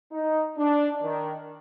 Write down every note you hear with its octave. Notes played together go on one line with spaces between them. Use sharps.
D#4
D4
D#3